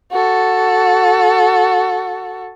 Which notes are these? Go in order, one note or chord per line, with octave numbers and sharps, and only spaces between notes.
F#4 A4